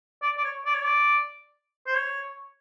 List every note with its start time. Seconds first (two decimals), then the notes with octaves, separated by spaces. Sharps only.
0.22 D5
0.37 D5
0.44 C#5
0.65 D5
0.74 C#5
0.84 D5
1.87 C5
1.95 C#5